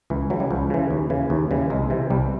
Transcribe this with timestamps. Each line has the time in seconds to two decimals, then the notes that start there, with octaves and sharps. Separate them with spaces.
0.10 C#2 E3
0.30 C#3 E3 F#3
0.40 G3
0.51 C#2 F3
0.70 C#3 E3
0.91 D#2
1.10 C#3 E3
1.30 D#2
1.51 C#3 E3 G3
1.70 C2 G#3
1.90 C3 E3
2.10 C2 G3